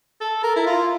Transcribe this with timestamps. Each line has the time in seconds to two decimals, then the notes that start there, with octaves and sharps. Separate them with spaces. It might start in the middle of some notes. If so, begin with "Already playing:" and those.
0.21 A4
0.43 A#4
0.56 E4
0.66 F4